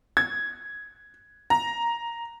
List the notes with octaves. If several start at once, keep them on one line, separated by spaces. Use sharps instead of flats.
G#6
A#5